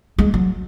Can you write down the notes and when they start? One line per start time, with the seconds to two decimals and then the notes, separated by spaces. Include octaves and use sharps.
0.18 G#3
0.34 F#3